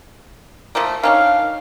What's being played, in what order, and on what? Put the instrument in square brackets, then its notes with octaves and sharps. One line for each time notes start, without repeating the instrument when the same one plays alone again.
[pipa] F3 A3 A#3
[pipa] D#3 C#4 D4 [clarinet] F5